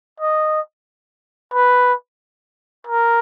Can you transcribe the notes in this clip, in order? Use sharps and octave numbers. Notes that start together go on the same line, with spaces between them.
D#5
B4
A#4